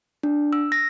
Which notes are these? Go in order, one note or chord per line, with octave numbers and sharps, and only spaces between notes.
D4
E6
A#6